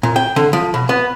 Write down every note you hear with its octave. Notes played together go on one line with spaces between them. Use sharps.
A#2
G5
D3
F3
B2
B3